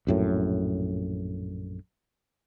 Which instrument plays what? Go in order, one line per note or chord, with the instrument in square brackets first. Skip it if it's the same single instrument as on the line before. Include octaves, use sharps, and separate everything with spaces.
[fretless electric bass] A#1 F#2 A2